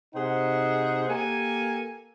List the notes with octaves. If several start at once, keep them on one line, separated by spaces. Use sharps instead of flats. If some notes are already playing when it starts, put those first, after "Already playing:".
C3 D#4 G#4 C5 F#5
A#3 G4 A4 G#5